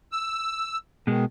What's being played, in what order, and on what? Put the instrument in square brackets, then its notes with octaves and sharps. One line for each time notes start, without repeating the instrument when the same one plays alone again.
[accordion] E6
[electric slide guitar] B2 G#3 [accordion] D#3